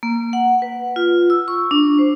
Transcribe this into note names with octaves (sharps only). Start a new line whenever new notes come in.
A#3
F#5
B4
F4
E6
C#6
D4
C5